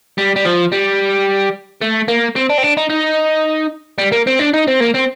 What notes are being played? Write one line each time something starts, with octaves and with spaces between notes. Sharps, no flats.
G3
G3
F3
G3
A3
A#3
C4
D4
C4
D4
D#4
D#4
G3
A#3
C4
D4
D#4
C4
A#3
C4